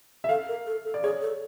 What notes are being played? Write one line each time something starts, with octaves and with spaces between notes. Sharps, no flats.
E5
A4 F5
A#4
A4
A4
D5
G#4 C#5
A4